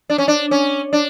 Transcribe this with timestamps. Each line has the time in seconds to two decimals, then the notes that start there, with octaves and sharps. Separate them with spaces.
0.10 D4
0.18 C#4
0.28 D4
0.51 C#4
0.93 D4